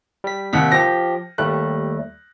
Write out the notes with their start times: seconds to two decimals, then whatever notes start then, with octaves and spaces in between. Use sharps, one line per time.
0.24 G3 B6
0.53 D#2 C3 F#5 B6
0.72 F3 G4 A#6
1.38 D#2 G3 A3 F#6